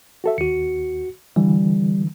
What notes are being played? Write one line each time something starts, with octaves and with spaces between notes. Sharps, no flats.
F#4 A4 E5
D#2 F#4 C#7
D3 E3 G3